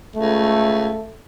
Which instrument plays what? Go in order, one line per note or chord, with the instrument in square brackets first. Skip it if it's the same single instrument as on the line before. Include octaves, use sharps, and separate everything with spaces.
[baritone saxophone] C#2 [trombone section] A3